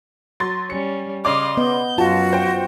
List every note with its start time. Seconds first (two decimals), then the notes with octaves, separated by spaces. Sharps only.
0.40 F#3 C6 A6
0.70 G3 C#4 C#7
1.25 C#3 D5 D#5 F5 C6 D6
1.57 B3 D#5 G6
1.98 F#2 F4 F#4 A5
2.33 C5 G5